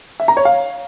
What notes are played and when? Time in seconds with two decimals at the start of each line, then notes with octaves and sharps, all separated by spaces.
0.20 E5
0.28 A#5
0.37 C#5
0.45 F5